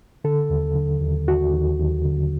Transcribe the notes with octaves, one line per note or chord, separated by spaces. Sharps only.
D3 A4
D#2
D3
D#2
D#2 F#4
D#2
D#2
D3